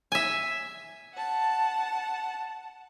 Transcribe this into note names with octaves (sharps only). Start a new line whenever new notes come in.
E5 G#5
F#5 A5